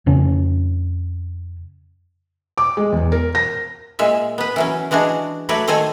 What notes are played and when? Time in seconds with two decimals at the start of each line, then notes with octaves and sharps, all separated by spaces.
0.06 F2 C#3 C#4
2.58 D6
2.77 G#3
2.92 E2
3.12 A#4
3.35 A#6
3.99 A#2 G#3 E5
4.38 B3 B4
4.56 E3 F#3 C#4
4.91 E3 G#3 D4 F#4 G#4
5.49 F#3 A3 F#4 B4 C#5 D5
5.68 D#3 A4 C5 C#5 G#5